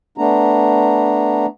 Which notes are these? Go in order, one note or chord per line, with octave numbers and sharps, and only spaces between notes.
A3 B3 D4 A#5